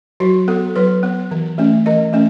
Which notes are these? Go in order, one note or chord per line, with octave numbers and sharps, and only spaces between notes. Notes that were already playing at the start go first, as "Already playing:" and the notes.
F#3 F#4
B3 A4
F#3 B4
B3
E3
A3 C#4
E3 D#5
A3 C#4